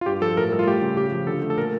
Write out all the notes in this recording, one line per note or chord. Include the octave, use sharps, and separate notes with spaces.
F4
G2 G4
F3 A4
A2 A#4
G3 A4
F4
A3 G4
C#3
C#3 G4
F3
D3 A4
A3
A4
A#2 A#4